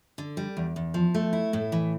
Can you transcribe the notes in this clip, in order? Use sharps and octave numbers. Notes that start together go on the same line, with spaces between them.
D3
G3
E2
E2
F3
A3
E4
A2
E3